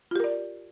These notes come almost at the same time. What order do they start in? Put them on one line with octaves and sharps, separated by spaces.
F4 G4 A#4 D5